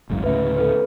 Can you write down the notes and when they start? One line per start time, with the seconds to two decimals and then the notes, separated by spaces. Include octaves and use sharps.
0.10 G#1 C#2 F#2
0.24 D2 A2 C#3 B4 E5
0.57 A4 B4